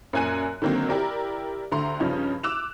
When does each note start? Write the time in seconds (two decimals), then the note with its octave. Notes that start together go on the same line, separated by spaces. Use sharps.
0.13 F#2 A#2 G#5 F#6 D#7
0.62 D3 D#3 F#3 A#3 C4
0.89 E4 G4 A#4 D5
1.72 D2 D3 A#5 C6
2.00 G2 C#3 F3 C#4 D#4
2.43 D6 E6 F#6 E7 F7